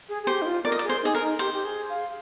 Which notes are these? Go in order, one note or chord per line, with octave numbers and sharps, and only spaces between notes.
G#4
G#4
G4 C5
D#4
F4
A#4 D5
D#5
D5
G#4
C5
D#4 G#4
A#4
D#4
G4 C5
G4
G#4
F5